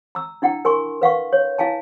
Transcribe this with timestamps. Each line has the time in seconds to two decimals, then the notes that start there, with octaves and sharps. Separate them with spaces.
0.15 A#5 E6
0.42 D4 E4 F#5 G5 A#5
0.65 A#4 G#5 C6 C#6
1.02 B4 F5 F#5 C#6
1.33 C#5
1.58 E4 F5 G#5 A5